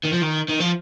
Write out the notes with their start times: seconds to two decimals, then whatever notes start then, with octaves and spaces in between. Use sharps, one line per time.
0.05 D#3
0.14 F3
0.23 D#3
0.49 D#3
0.60 F3